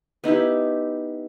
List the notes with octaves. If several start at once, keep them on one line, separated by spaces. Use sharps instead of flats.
B3 D#4 E4 G4